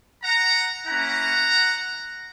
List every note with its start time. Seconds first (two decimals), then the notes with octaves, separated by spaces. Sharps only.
0.23 F#5 A#5
0.87 A#3 C#4 E4 F#5 A#5